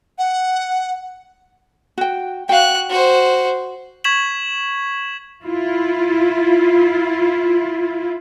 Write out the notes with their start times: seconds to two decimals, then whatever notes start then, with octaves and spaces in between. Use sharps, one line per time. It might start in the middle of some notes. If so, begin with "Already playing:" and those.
0.19 F#5
1.98 F#4 G5
2.49 F#4 F5 G5 F#6
2.90 F#4 C5
4.04 C#6 G#6 B6 E7 F#7
5.45 E4 F4